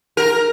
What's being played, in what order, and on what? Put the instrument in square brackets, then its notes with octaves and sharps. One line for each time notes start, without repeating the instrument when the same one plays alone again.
[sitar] A#4